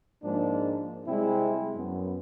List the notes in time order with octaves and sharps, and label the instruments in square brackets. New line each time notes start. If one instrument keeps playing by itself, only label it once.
[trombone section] G#2 F3 G#3 A#3 D4
C3 G3 G#3 C4 E4
F#2 B3